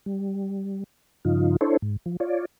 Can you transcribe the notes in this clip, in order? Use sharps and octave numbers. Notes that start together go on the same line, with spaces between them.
G3
G2 C#3 F3 D#4 F4
D4 E4 A4 C5 C#5
G#2
F3
F4 C#5 D5